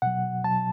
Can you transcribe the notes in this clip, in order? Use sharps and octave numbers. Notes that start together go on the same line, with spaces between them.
B2 F#3 F#5
B2 F#3 A5